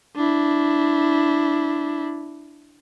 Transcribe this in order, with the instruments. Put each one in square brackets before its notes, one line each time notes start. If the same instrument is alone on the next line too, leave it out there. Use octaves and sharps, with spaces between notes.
[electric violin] D4 E4